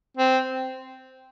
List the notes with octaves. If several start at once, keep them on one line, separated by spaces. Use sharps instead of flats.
C4